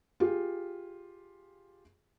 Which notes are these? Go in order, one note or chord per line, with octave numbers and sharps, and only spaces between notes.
F4 G4 G#4